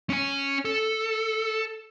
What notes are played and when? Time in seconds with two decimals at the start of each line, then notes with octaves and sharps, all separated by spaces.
0.10 C#4 G#5
0.65 A4